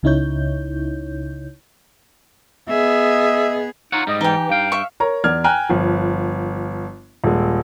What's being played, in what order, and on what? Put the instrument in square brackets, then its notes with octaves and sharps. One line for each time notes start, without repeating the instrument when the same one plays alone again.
[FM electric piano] C#2 C#3 D#4 E4 C#5 G6
[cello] B3 G#4 [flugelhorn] D#5 [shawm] E5
[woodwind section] D#4 [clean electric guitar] F4 C#5 F#5
[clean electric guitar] G#2 G3 [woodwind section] D#5
[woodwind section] E3 [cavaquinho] D#4 G4
[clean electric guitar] G2 G5 [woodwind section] F5
[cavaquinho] E5 C#6
[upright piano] A#4 C#5 A#5
E2 D5 F6 G#6
G5 G#5 A#5 F6 F#6
G1 F3
D#1 G#3